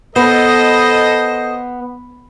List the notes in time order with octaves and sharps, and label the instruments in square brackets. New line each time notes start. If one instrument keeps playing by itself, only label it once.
[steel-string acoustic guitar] B3 [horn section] A4 C5 D#5